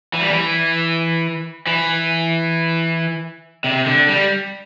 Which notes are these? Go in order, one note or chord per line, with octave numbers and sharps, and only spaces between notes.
E3
G3
E3
E3
C3
D3
G3